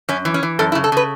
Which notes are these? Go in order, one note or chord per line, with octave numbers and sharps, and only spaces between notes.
F#2 C#4
E3
C#4
E3
F#2 A4
E4
C#3
A4
C#3 B4